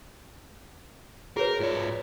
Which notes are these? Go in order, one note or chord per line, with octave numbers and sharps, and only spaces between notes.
F#4 G#4 A#4 B4 C#5
G#2 F4 C#5 D5